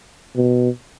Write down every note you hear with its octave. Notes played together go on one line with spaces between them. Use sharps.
B2